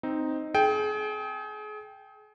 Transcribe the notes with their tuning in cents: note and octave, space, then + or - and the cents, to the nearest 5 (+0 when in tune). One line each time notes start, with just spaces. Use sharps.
C4 +0 D#4 +0
G#4 +35 G5 +0